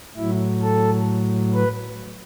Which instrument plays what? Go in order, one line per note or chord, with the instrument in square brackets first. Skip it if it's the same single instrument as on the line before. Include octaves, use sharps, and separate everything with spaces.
[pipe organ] A2 F#3 E4
A4
B4